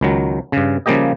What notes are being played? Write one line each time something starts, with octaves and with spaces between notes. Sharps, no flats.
C#2 D#3 F#3
G2 C#3
C#3 F3 G3 A#3 G4 D#5